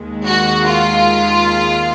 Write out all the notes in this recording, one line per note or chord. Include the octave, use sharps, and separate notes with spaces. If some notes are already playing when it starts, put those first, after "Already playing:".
Already playing: D#2 D#3 G#3
F#4
F4